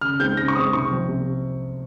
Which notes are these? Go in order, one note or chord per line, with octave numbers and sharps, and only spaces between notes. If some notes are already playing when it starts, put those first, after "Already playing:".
C#3 F6
G#3 C4 D#4 G6
C#3 A#6
C#6
G#3 C4 D#4 D#6
C3 C#6
F3 C4
C3